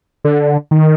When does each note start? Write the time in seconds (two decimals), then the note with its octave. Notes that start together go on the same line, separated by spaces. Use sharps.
0.25 D3
0.71 D#3